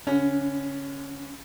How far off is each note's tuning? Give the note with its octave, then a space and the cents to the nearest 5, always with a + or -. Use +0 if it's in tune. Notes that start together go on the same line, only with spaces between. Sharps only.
D3 -40 C#4 +0